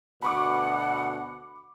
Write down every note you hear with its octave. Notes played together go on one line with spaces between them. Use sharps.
D2 B2 F#5 B5 C#6 D6